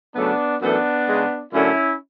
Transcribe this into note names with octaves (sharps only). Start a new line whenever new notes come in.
C#3 F#3 A3 B3 D4
F#2 E3 A3 B3 D4
C#3 G#3
F#2 D3 A3 C#4 E4